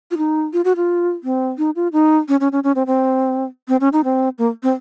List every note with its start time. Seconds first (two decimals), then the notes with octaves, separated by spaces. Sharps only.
0.11 F4
0.18 D#4
0.53 F4
0.65 F#4
0.76 F4
1.24 C4
1.58 D#4
1.76 F4
1.93 D#4
2.28 C#4
2.40 C#4
2.52 C#4
2.64 C#4
2.76 C4
2.87 C4
3.68 C4
3.81 C#4
3.93 D#4
4.04 C4
4.38 A#3
4.63 C4